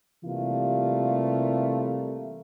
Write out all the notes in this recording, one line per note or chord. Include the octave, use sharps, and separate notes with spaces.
C3 E3 G3 A3 A#3 F4